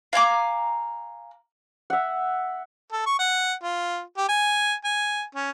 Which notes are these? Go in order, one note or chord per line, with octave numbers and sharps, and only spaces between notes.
F5 G#5 A#5 D6
E5 F#5
A4
C#6
F#5
F4
G4
G#5
G#5
C#4